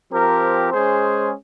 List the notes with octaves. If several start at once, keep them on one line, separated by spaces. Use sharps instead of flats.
F3 C4 G4 A#4
G#3 C#4 G#4 C5